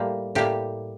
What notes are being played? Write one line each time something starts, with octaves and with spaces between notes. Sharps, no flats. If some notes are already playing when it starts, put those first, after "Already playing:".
Already playing: A2 G3 A#3 F4
A2 G3 A#3 G4